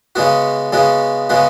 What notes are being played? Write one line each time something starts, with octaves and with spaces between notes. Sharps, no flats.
C#3 G#3 B3 F#4
C#3 G#3 B3 F#4
C#3 G#3 B3 F#4